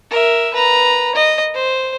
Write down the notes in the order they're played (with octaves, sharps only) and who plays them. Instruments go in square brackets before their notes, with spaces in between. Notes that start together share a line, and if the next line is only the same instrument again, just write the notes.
[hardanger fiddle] A#4 E5
B4 A#5
D#5
C5